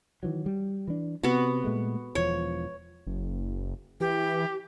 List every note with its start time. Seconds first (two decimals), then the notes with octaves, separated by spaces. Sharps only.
0.23 D#3 E3 F#3
0.46 G3
0.88 E3 D4
1.23 C3 B3 F#4
1.64 A#2 G#3 A3
2.15 E1 E2 F3 C#5
3.07 F#1
4.00 E3 G4